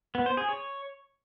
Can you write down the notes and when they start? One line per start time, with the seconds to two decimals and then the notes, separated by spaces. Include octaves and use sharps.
0.15 B3
0.26 C5
0.37 G#4
0.49 C#5